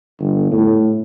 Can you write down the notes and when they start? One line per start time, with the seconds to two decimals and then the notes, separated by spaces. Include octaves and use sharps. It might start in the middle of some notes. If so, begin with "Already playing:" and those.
0.19 G1
0.51 A2